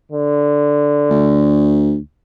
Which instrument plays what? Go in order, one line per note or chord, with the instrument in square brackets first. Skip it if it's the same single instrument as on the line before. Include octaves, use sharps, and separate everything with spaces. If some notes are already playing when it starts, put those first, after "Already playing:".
[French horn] D3
[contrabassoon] D2